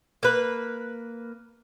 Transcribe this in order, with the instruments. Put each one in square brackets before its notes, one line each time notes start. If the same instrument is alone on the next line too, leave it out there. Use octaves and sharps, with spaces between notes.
[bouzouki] A#3 B4